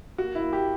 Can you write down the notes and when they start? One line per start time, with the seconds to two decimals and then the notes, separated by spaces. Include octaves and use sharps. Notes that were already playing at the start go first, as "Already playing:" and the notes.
0.18 A#3 F#4
0.35 E4
0.41 A#3
0.53 G4